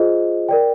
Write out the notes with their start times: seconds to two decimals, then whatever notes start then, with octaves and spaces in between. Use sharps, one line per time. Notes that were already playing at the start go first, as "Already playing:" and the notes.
Already playing: F4 G#4 C5 D#5
0.49 A#4 D5 G5